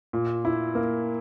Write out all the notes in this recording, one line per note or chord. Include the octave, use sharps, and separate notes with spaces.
A#2
E4
A#3